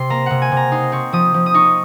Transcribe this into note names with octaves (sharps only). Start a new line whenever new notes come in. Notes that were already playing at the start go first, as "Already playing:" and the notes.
Already playing: C3 C6
A#3 A#5
C3 F#5
G#5
C3 A#5
D#4 C6
C4 C#6
F3 D#6
F3
D#6
D#4 C#6